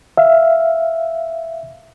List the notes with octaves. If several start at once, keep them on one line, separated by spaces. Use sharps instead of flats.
E5 F5